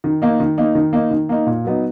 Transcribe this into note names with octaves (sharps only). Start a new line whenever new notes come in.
D#3
A#3 D#4
D#3
A#3 D#4
D#3
A#3 D#4
D#3
A#3 D#4
A#2
F#3 B3 D#4